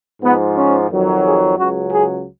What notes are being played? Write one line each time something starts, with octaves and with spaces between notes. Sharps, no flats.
G#2 F3 B3
C#4
F2 D#3 F#3
G#4
C#2 C#3 F#3 F#4
G#4